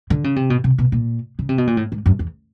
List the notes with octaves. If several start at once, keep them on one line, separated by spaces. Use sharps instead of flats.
D3
C#3
C3
B2
C3
B2
A#2
C#3
C3
B2
A#2
A2
G#2
F#2
E2